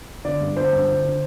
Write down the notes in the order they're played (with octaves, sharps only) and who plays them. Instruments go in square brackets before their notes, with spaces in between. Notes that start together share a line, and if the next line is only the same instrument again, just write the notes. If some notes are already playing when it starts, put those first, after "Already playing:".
[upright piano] D3 D5
G2
D3 C5
G2
D3
D3